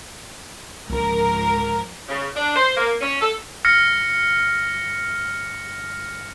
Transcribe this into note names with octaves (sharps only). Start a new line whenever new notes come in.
C#2 G#2 D3 F3 A#4
C#3
D4
C5
A#3
C#4
A4
G1 F6 A#6 C#7